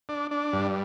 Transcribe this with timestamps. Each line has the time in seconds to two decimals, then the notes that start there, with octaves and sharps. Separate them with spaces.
0.09 D4
0.31 D4
0.53 G2